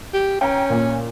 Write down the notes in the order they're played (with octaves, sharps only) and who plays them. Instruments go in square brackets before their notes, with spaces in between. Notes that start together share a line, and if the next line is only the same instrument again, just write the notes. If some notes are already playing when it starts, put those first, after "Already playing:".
[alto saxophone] G4
[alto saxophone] C#4 [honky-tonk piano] G5 A#5
[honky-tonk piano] A#2